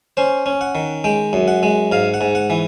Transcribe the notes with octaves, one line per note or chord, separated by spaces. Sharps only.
C#4 C5
C#4
F#5
D#3
G#3 G5
F#2
F#5
G#3
G#2 F5
F#5
G#2
F#5
E3